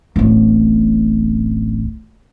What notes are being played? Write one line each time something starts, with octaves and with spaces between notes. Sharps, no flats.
D1 A1